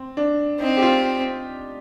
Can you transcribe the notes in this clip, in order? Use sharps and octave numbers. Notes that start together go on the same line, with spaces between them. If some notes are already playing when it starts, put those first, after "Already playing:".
Already playing: C4
D4
C4 D#4
G4
F4